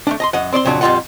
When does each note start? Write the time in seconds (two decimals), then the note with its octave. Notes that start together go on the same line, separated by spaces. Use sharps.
0.07 A3 C#4 D4
0.20 D#5 A#5 C6
0.33 F#2 D#5 F#5
0.52 C4 D5 D#5 C6
0.65 F2 A#2 C#3 F#3 D4
0.81 F2 A#2 G3 F4 D#5 F#5